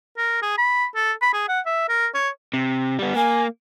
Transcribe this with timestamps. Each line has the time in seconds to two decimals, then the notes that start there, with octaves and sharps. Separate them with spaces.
0.17 A#4
0.42 G#4
0.58 B5
0.95 A4
1.22 B5
1.33 G#4
1.49 F#5
1.66 E5
1.89 A#4
2.15 C#5
2.54 C3
2.99 G3 B3
3.16 A#3 G#5